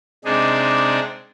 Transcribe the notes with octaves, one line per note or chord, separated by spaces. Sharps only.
C3 G#3 D4 D#4 G#4